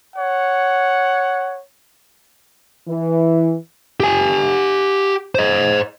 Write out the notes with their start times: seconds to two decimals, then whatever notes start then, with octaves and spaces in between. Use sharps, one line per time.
0.14 C#5 F#5
2.88 E3
4.00 G4 G#5
5.35 C5 D#5